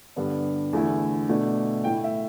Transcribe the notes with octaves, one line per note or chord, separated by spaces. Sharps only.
G2 D3 G3 B3 D4
E2 D3 A3 E4
B2 A3 D4
A2 A3 E4 G5
E5